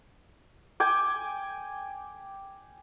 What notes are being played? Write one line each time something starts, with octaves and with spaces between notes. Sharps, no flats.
G5 G#5 D6